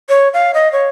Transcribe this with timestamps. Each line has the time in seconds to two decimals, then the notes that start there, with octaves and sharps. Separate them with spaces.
0.09 C#5
0.34 F5
0.54 D#5
0.72 C#5